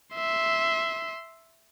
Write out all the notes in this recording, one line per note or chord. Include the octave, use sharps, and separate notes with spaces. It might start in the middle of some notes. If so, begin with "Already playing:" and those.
E5 C6